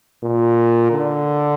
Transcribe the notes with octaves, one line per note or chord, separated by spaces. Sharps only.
A#2
D3